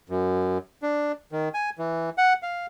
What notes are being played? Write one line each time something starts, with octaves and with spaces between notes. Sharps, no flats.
F#2
D4
D#3
G#5
E3
F#5
F5